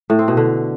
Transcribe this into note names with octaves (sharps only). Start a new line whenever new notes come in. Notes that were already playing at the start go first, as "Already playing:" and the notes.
A2
C4
B2
D3